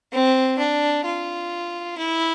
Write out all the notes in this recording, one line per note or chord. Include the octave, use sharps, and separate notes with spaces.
C4
D4
F4
E4